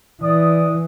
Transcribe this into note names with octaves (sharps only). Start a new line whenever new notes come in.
E3 D5 D#6